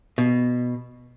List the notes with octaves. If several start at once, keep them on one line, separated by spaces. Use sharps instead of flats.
B2